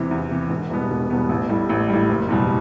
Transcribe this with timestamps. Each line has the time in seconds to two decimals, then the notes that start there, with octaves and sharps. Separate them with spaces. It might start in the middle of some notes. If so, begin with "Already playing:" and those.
Already playing: E2 C3 E3
0.11 E2
0.31 C3 E3
0.50 E1
0.70 E2 B2 G3 B3
0.90 E1
1.10 E2 B2 G3 B3
1.29 A1
1.49 A2 G3
1.69 A1
1.89 A2 G3
2.09 F#1
2.29 E2 B2 G3